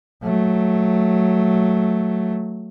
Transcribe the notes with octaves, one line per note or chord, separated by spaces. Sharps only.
F#3 A3